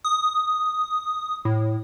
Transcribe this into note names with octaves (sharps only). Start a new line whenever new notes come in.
D#6
A2